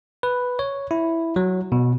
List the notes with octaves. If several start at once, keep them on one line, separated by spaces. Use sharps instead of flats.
B4
C#5
E4
F#3
B2